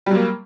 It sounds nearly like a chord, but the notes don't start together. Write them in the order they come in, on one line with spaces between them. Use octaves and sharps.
G3 F#3 A#3